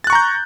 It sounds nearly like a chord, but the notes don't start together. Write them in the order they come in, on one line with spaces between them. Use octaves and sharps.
A6 F#6 C#6 A#5 G6